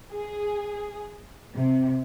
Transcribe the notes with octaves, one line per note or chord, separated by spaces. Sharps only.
G#4
C3